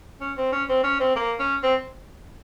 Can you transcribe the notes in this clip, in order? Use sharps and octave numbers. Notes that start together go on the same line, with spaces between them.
C#4
C4
C#4
C4
C#4
C4
A#3
C#4
C4